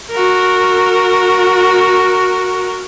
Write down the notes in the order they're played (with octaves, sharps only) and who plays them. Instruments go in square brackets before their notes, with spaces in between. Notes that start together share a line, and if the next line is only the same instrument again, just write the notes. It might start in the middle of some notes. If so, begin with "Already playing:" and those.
[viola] F#4 A#4